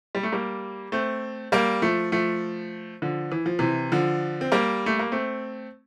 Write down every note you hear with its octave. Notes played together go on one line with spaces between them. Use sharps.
G3
A3
G3 A#3
A3 C4
G3 A#3
F3 A3
F3 A3
D3 F3
E3
F3
C3 E3
D3 F3
C4
G3 A#3
A3
A#3
A3 C4